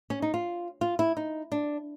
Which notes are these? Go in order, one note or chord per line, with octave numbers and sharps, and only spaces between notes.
C#4
D#4
F4
F4
E4
D#4
D4